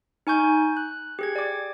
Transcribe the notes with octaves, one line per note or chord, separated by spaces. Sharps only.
D#4 G#5 C#6 G6
F#6
G4 G#4 G#6
D5 D6